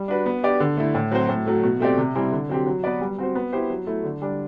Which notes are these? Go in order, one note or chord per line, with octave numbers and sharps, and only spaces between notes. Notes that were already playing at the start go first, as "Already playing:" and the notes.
Already playing: G3
D4 F#4 B4
B3
D4 G4 D5
D3
A3 E4
A2
F#3 C4 F#4 C5
A2
F#3 A3
B2
A3 C4 G4 D5
C3
G3 C4 E4
D3
F#3 C4 G4
F#3
B3 F#4 B4 D5
G3
C4 F#4 C5
B3
E4 G4 C5
F#3
A3 E4
D3
G3 D4